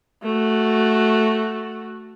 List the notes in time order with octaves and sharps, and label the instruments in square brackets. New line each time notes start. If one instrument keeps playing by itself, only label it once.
[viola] A3 F#4